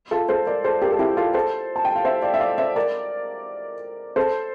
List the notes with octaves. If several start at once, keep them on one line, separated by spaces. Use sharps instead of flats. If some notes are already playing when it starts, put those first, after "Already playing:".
F4 A4
A4 C5
A#4 D5
A4 C5
G4 A#4
A4
E4 G4
F4 A4
A4 C5
A5
G5
F5
C5 E5
D5 F5
E5
D5 F5
C5 E5
A#4 D5
A4 C5